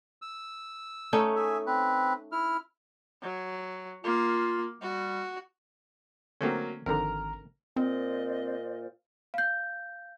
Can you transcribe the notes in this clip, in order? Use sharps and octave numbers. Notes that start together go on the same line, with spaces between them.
E6
A3 C#4 D#4
G#4 E5
C4 B4
E4 F6
F#3
A#3 F4
G3 F#4
D3 F#3 A3 A#3 C4 C#4
G#1 F2 G#2 D3 A#4 A#5
A#2 C4 C5 D5 D#5
F5 G6